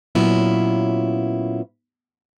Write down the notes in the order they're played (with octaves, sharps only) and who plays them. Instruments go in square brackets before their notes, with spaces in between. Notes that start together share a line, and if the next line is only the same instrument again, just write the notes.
[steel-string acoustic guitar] A#2 F#3 B3 C#4 E4 F4